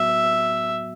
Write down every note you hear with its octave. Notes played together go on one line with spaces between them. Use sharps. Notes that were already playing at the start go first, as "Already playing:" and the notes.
Already playing: A2 F#3 B3 F#4 E5